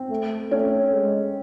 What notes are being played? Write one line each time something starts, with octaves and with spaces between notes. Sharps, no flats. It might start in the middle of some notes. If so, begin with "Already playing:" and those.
Already playing: C4
A3
A3 C#4
G#3